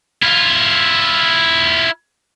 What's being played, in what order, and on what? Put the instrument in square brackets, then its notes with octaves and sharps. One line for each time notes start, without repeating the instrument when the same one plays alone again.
[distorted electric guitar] E4 F4